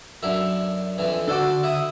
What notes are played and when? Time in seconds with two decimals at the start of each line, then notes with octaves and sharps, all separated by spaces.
0.23 F#2 D3 E4
0.98 F2 D3 E3
1.28 D3 D4 F#4 A4 C5 D5
1.63 E4 D#6